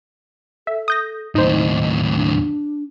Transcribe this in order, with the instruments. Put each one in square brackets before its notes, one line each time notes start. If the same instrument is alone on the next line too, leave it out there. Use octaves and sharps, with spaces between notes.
[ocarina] A4 [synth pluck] E5
[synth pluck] D#6 G6 A#6
[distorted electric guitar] D#2 A2 [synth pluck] D#4 C5 [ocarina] D#5
[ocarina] D4